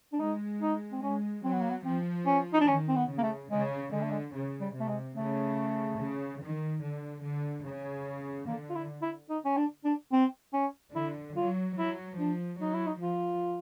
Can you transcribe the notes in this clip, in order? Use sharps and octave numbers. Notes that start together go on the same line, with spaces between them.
D4
G#3 D#4
D#4
C4
G#3 C#4
F#3 C4
B3
A#3
B3
F3 C4
C#4
D#4
D4
D#3 C#4
C4
B3
C#3
A#3
A3
C#3 G#3
D3 G#3
A3
G#3
C#3
G3
C3
A3
G#3
C#3 A3
C#3
D#3
D3
D3
C#3
D3 A#3
F4
E4
E4
D#4
C#4
D4
D4
C4
C#4
D3 E4
F#3 F4
F#3 E4
F3 D4
F#3 D#4
E4
D#4
F3 F4